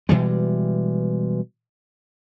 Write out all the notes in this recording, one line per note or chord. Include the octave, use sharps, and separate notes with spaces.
B2 E3 G3 G#3